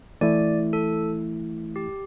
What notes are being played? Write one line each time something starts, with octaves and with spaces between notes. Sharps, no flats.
E3 A3 E4 D5
A4
G4